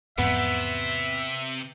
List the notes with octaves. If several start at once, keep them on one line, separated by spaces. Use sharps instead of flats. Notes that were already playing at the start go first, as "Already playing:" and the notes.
E2 G#2 C3 F3 B3 E5